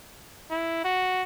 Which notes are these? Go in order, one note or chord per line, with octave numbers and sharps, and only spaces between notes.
E4
F#4